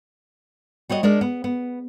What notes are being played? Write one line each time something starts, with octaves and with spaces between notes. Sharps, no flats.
G3 F#4 C#5 D#5
G#3 D4 A#4 D5
B3
B3